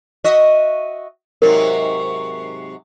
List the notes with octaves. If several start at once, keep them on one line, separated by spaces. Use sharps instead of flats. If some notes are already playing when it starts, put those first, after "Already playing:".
F#4 D#5 E5
G#2 C3 F#3 A#4